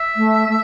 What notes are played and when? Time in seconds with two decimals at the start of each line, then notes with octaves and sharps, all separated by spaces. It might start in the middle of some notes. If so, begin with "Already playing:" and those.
Already playing: E5
0.16 A3
0.48 A3